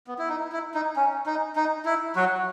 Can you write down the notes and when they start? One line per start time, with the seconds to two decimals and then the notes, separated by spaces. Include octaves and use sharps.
0.07 B3
0.19 E4
0.29 D#4
0.52 E4
0.74 D#4
0.96 C#4
1.26 D#4
1.56 D#4
1.85 E4
2.16 F#3 F#4